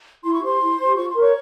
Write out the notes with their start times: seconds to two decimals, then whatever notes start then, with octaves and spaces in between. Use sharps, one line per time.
0.23 E4 C6
0.33 C#6
0.42 G4 C5 C6
0.61 E4
0.78 C5
0.84 G4
0.97 F4 C#6
1.09 C6
1.15 A#4 C#5 C#6